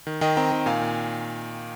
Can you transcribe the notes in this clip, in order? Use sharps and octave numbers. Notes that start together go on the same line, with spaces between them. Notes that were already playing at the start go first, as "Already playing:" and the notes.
D#3
D#3 D#5 G5
C4 G5 A#5
D#3
A#2 F5 G#5
A#2